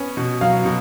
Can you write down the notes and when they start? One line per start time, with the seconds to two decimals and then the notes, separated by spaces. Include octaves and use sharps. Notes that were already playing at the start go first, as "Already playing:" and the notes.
Already playing: B3 C#4
0.17 B2
0.41 F#3 F5
0.65 B2